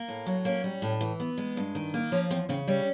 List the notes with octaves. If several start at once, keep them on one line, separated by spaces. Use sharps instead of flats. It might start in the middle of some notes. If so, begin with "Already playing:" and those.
Already playing: A#3
A2
F#3
A#3 C#4
G3
A2
E3
B3
G#3
G2
D#3
A#3
F3 C#4
E2 C4
C#3 C4
G3 C#4